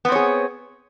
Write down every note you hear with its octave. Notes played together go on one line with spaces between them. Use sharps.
B3 C4 G#4 C#5